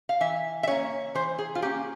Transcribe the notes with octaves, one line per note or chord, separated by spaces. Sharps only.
F5
E3 E5
E5
A#3 C#4 C#5
E3 C5
G#4
F4
A#3 C#4 G4